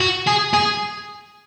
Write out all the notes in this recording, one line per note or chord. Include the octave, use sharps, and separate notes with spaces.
F#4
G#4
G#4